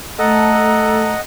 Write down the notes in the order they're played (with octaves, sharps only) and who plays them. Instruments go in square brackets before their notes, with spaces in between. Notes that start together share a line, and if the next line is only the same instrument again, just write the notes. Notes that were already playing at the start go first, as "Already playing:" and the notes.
[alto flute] A3 [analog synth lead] A4 [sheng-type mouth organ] D#5 F#5 [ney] A#5